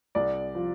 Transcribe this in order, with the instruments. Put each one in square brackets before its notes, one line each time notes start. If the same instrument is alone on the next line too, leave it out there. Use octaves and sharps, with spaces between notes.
[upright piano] C2 D5
F3